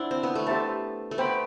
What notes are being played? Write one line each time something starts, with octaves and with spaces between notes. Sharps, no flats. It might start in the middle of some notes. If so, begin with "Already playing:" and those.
Already playing: D4 E4 C5 F#5
C4
B3
A3
B3 G4 C5 E5 A5
A3
B3 C5 G5 B5